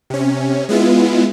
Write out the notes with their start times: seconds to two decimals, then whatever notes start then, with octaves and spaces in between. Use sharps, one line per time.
0.10 C3 C#4
0.69 G#3 B3 E4 F4